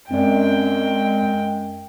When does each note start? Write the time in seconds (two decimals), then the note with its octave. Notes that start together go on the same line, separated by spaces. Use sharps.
0.11 F#2 G#3 C4 D5 G5